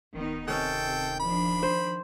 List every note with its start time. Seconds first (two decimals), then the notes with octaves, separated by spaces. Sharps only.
0.15 D1 D#3 B3 D#4
0.48 C3 D#3 C#4 A4 G5
1.20 F3 D4 B5
1.63 C5